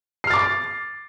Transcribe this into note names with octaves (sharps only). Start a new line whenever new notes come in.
D6 F6 A6 C7